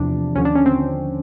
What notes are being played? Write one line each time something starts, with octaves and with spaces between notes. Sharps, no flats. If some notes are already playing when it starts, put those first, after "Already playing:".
Already playing: E2 C3 F3 D4
D#2 D3 F3 C#4
D4
C#4
C4